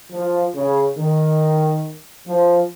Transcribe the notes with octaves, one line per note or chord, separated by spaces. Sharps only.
F3
C#3
D#3
F3